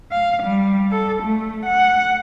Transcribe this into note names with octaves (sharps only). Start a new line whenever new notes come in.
F5
G3
A4
A3
F#5